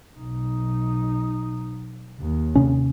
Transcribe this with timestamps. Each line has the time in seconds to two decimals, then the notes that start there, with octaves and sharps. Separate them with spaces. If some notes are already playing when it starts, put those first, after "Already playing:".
0.17 B1 D#4
2.20 D#2
2.55 C3 C#4